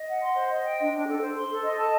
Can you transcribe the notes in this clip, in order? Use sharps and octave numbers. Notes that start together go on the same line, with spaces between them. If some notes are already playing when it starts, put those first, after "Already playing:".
Already playing: D#5
F#5
C6
C5
D#5
G5
D4
D4
A4
C5
C6
A4
D#5
A5